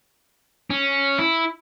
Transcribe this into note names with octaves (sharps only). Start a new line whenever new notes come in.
C#4
E4